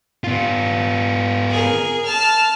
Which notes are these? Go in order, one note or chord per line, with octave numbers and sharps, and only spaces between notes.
B3 F4
G#4 A#4
A5 F6